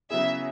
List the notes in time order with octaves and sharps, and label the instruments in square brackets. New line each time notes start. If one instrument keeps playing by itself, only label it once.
[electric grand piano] C#3 F#3 B3 E4 G#4 [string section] E5